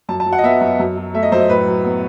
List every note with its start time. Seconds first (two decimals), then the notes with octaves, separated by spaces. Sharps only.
0.09 F#2 A5
0.20 A5
0.27 F#3
0.32 F#5
0.38 D#5
0.44 B3 E5
0.61 F#2
0.79 F#2
0.97 F#3
1.14 A3 E5
1.23 D#5
1.32 F#2 C5
1.40 D#5
1.50 A2 B4
1.67 F#3
1.85 B3